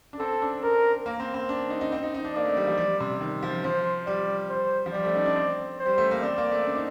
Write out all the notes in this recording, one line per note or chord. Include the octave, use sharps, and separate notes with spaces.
D4
C4 A4
D4
D4 A#4
A#3
C4
C4
D4
D#4
D#4
C4
D#4
D#4
D4
A#3 D5
A3
G3
F3
G3
C3
D#3
F3
F3 C5
G3 D5
C5
F3
G3 D5
A3
D#4
D4
C4
C5
G3
A3
A#3
C4 D5
A#3
A3
D4
D#4